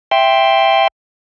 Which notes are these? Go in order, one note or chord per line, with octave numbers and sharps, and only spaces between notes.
E5 G5 C6